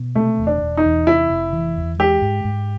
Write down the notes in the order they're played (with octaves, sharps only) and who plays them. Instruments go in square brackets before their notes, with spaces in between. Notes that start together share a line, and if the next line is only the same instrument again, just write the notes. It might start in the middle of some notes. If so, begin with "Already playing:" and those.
Already playing: [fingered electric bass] B2
[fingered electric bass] C3 [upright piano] A3
[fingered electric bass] E1
[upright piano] D4
[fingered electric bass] E1
[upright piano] D#4
[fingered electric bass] E2
[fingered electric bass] C3 [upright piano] E4
[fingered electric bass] F1
E3
E2
[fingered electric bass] G#3 [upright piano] G4
[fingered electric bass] G#2
G#2